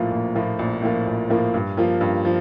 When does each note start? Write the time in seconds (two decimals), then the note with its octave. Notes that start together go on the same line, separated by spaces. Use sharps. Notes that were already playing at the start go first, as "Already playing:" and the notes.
Already playing: A#1 A2 F3 A#3 F4
0.11 A#1
0.35 A2 F3 A#3 F4
0.59 A#1
0.82 A2 F3 A#3 F4
1.07 A#1
1.30 A2 F3 A#3 F4
1.54 G2
1.77 F3 A#3 F4
2.01 G2
2.25 F3